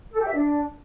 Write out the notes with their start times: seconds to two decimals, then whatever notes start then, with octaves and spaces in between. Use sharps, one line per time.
0.12 A4
0.19 G4
0.27 E5
0.34 D4